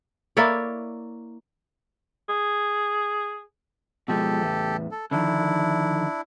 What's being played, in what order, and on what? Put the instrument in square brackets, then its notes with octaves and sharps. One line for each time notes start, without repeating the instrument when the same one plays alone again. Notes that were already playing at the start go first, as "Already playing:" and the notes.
[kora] A#3 E4 C#5 D5
[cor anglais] G#4
[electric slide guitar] B2 F3 G#3 [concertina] G4 A4
[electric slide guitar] E2 A2
[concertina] A4
[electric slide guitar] D3 D#3 F3 [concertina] D4 E4